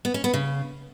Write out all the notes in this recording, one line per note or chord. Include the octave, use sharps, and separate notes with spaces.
B3
C#4
B3
C#3